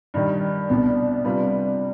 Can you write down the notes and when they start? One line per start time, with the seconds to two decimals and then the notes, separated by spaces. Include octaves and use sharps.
0.14 G2 D#3 G3
0.69 C2 B2 B3 D4
1.25 C3 G3 D4 F4 B4